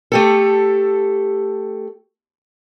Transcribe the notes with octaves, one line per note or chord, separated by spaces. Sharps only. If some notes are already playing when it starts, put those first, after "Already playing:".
A3 G4 A4